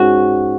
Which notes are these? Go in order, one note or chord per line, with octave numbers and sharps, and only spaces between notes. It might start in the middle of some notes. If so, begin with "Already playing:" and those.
Already playing: G#2 C#4 F#4